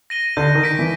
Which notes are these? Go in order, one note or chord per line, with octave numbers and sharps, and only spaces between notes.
A#6 D#7 G7
D3 G6
D#3
B6 D7
E3